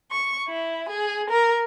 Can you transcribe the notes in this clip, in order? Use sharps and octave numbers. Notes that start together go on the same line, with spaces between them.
C#6
E4
G#4
A#4